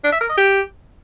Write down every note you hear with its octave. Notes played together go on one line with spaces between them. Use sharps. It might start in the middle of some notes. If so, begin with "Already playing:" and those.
D4
E5
A#4
D#5
G4